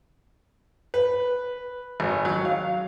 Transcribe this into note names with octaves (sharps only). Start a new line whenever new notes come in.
B4
G#1
F#3
F5